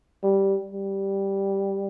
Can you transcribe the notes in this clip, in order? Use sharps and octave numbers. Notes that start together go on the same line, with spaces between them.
G3
G3